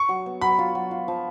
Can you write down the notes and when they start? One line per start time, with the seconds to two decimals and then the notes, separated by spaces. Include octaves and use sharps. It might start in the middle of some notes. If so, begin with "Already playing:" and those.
Already playing: C#6
0.09 F#3
0.26 B3
0.41 F#3 B5
0.59 F4
0.75 F#3
0.91 F4
1.08 F3